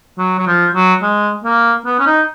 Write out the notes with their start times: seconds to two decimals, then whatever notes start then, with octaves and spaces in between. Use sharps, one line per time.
0.18 F#3
0.39 F#3
0.47 F3
0.74 F#3
1.02 G#3
1.44 A#3
1.86 B3
1.99 C#4
2.07 D#4